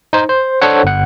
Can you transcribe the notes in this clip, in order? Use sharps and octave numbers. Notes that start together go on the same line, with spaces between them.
D#4 C5
C5
D4 A4 C5 C#5 F#5
G1 F#5